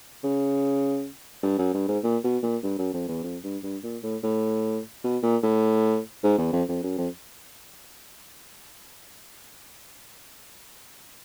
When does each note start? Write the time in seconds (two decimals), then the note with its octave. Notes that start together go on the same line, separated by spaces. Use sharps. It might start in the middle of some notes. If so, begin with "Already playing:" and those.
0.24 C#3
1.43 G2
1.59 F#2
1.74 G2
1.88 G#2
2.04 A#2
2.24 B2
2.43 A#2
2.63 G2
2.79 F#2
2.94 F2
3.08 E2
3.24 F2
3.44 G2
3.63 G2
3.84 A#2
4.03 A2
4.23 A2
5.04 B2
5.23 A#2
5.43 A2
6.23 G#2
6.38 E2
6.53 F2
6.68 F2
6.83 F#2
6.98 F2